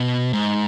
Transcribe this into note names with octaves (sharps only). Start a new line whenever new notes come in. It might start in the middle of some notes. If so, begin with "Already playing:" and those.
Already playing: B2
G#2